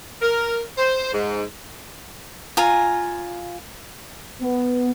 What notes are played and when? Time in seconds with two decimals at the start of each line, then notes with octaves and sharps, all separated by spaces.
0.22 A#4
0.78 C5
1.13 G#2
2.57 F4 G#5 A#5
4.42 B3